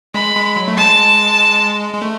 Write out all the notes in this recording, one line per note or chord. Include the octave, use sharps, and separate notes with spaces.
G#3 B5
G#3
F#3
A3
G#3 A5
G#3
A3